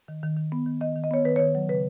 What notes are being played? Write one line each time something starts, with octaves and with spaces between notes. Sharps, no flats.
D#3
D#3
D#3
B3
D#3
D#3 D#5
D#3
D#5
B3 C#5
D#3 B4
D#3 C#5
F#3
C#3 B4